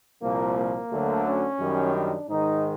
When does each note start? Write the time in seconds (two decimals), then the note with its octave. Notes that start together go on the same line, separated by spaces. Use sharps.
0.22 C2 A#2 F3 A#3
0.57 A#3
0.91 D2 D3 F#3 A3
1.26 C#4
1.60 F#2 D#3 G3
1.94 D4
2.29 G#2 D#3 G#3 D#4